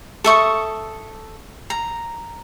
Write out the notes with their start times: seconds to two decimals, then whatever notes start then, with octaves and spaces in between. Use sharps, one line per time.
0.24 A4 E5 C#6 D#6
1.70 A#5